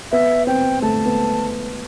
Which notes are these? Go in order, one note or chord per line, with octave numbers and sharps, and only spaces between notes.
B3 E5
C4 G5
A3 A5
B3